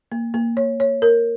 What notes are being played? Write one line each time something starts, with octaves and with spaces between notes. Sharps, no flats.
A#3
A#3
C#5
C#5
A#4